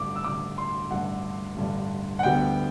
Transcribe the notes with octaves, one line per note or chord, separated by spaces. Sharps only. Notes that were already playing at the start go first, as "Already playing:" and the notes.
Already playing: A1 G2 D3 D6
E6
A1 G2 D3 D6
C6
A1 G2 D3 F#5
A1 G2 D3
F#5
D2 D3 G3 B3 G5